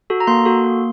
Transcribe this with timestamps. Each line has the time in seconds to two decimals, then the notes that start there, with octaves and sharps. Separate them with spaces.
0.10 F#4 A4
0.20 A#5
0.27 A#3 C6
0.45 F#4 A4
0.65 A#3